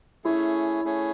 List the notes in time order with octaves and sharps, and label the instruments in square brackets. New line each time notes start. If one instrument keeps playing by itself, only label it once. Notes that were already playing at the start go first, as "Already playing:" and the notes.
[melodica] A3 C#4 G#4 C#5 [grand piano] E4
[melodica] A3 C#4 G#4 C#5